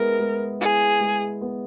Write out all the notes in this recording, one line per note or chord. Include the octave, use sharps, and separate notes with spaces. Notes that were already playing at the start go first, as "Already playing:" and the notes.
Already playing: G#3 B3 E4 A#4
G#3
E4 G#4
G#3
B3